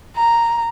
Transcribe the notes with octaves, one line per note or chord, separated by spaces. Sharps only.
A#5